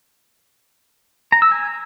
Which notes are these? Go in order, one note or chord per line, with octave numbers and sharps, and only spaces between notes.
A#5
E6
G#5